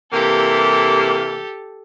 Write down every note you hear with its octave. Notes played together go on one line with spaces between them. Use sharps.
C3 E3 A#3 G4 A4